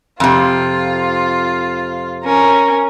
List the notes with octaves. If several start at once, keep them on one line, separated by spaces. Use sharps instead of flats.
F2 C3 F4
C#4 A#4